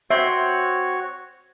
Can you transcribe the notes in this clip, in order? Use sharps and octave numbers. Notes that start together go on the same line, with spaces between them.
C4 F#4 C#5 E5